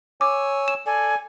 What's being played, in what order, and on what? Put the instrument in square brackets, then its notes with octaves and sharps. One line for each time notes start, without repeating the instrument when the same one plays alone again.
[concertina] C#5 G#5 E6 [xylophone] D6
[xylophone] E7
[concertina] A4 D5 [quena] G#5